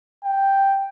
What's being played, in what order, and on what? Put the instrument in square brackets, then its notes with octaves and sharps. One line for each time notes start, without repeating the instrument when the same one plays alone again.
[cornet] G5